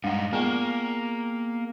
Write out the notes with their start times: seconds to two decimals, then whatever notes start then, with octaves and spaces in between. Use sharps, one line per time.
0.04 G2 G#3 D#4 F#5
0.33 A#3 B3 G#4 G5